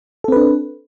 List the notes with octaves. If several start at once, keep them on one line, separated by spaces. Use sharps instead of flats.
C4 D4 A4 B4